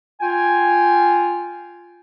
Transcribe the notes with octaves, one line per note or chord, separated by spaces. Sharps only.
F4 G5 G#5